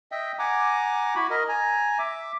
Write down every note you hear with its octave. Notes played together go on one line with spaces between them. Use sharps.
D#5 E5 G5
F#5 G#5 A#5 D6
E4 F#4 B5
A#4 D#5
G#5 A#5
E5 D6